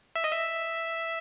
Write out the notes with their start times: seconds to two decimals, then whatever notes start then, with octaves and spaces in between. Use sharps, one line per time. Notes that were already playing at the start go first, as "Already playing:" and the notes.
0.16 E5
0.24 D#5
0.33 E5